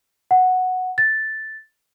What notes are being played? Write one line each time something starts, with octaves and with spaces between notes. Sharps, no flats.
F#5
A6